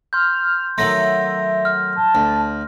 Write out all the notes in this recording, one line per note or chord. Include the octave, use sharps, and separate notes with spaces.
C6 F6 G6
D#3 F#3 A3 E5 C6 A#6
F6
A5
D2